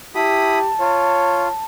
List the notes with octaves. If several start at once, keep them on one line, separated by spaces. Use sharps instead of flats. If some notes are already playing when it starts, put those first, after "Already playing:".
E4 G4 A5 B5 D#6
F4 C#5